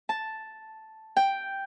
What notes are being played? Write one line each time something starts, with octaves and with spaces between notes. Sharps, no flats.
A5
G5